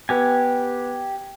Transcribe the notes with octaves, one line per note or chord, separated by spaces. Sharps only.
B3 G4 B4 G#5